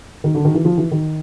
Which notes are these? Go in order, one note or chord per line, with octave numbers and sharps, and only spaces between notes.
D#3
D3
D#3
E3
F3
E3
D#3